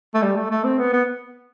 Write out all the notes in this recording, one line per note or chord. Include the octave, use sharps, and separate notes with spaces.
A3
G3
A3
A3
C4
B3
B3